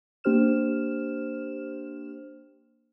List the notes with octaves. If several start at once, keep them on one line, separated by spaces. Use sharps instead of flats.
A#3 D4 G4 C5 F6 E7